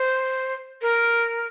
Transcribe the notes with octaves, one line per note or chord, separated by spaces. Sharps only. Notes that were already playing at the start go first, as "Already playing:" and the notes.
Already playing: C5
A#4